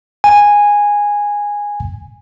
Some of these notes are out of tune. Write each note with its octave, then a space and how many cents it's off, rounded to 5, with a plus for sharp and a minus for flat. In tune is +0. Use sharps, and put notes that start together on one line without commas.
G#5 -10